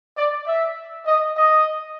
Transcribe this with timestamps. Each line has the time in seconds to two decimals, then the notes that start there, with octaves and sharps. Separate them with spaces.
0.17 D5
0.47 E5
1.07 D#5
1.37 D#5